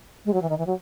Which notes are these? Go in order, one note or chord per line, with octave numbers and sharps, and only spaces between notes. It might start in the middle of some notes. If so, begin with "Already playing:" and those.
G#3
F#3
E3
D#3
E3
F#3